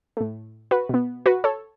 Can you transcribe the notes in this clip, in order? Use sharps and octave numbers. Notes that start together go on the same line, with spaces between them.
A2 A3
F#4 B4
B2 B3
F#4 B4
A4 C#5